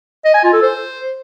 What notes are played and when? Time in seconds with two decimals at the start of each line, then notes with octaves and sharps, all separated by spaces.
0.25 D#5
0.34 G#5
0.44 F4
0.53 A4
0.62 C5